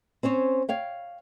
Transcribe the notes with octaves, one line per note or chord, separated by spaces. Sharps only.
C4 C#4 C5 C#5
C#5 F5 G5